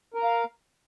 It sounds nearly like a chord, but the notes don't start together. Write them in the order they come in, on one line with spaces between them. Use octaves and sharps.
A#4 A#5 F5